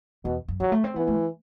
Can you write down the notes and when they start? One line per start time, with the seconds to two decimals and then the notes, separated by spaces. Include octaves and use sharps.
0.25 E2 B2
0.48 F#2
0.60 E3 F#3
0.72 A3
0.84 C4
0.95 E3 B3
1.07 A3
1.18 D3